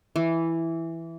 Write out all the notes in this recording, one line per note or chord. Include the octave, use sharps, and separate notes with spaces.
E3